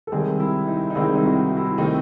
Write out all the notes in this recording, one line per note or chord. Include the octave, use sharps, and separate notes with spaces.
A4
C2 C3 D#3 G#3 C4 G#4
E4
D#4
D#4
C2 C3 D#3 G#3 C4 E4
D#4
F#4
E4
E4
C3 D#3 A3 C4 D#4